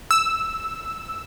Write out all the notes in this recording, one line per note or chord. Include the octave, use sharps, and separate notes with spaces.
E6